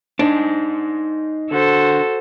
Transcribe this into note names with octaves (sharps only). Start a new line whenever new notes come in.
D4 D#4 C5
D3 F#4 A4 C5